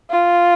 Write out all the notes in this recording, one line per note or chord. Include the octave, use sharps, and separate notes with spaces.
F4